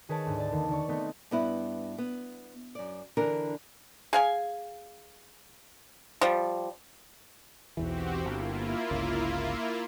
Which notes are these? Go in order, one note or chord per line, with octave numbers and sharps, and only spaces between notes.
D#3 G#4 B4 C#5 A5 D7
D2 G#2
D5 A5
D#2 D3 D#3
D#3 D5 C#6
A3 B3 C4 D#4
G2 B3 E4
B3
F#2 D5
D3 E3 D4 A#4
G#4 F5 G#5
F3 G3
B1 E2 E3 C4 F#4 G4
G1 A#3 E4 F4
G1 C#2